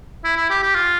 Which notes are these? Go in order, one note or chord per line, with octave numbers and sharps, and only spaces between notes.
E4
E4
G4
G4
F4